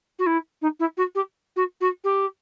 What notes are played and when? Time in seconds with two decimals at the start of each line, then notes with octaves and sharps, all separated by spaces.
0.19 F#4
0.26 E4
0.61 D#4
0.79 E4
0.97 F#4
1.15 G4
1.56 F#4
1.81 F#4
2.04 G4